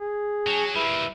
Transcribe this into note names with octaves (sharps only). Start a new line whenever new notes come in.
G#4
F#3 C#4 G5 A5
G3 A#3 E4 B4